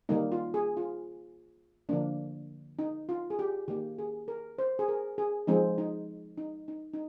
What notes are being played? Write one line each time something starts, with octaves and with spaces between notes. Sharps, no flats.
D#3 G3 A#3 D#4
F4
G#4
F4
D3 F3 A#3 D4
D#4
F4
G#4
G4
D#3 A#3 G4
G#4
A#4
C5
G#4
A#4
G#4
F3 G#3 C4 D#4
D#4
D#4
D#4
D#4